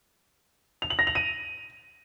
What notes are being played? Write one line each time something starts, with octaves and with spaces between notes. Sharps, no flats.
F7
F#7
A#6
F7
D#7